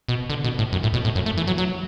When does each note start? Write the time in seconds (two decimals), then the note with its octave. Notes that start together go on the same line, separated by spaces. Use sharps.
0.08 B2
0.30 D3
0.44 B2
0.59 A2
0.72 F#2
0.83 A2
0.94 B2
1.05 A2
1.15 F#2
1.26 A3
1.37 E3
1.47 F#3
1.58 F#3